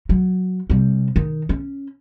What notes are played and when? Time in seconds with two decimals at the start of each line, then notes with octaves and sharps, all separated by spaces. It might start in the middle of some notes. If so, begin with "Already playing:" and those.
0.09 F#3
0.70 C3 G3
1.16 D#3
1.49 C#4